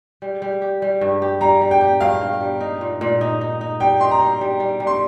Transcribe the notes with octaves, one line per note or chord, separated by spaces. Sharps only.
G3
G3
G4
G3
G2
G4
G3 A#5
G3
G5
G4
G2 F5
G2
G3
D#4
A#2
A#2
D#4
D#4
D#4
G3 G5
D#4 C6
A#5
G3
G3
G3
G3
C6